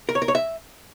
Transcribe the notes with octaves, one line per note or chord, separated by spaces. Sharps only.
A#4
C#5
A#4
C#5
E5